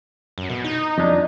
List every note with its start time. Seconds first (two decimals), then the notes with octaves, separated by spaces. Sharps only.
0.38 F#2
0.50 B2
0.64 D#4
0.98 F2 D4